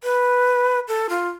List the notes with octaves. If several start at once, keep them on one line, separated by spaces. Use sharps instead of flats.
B4
A4
F4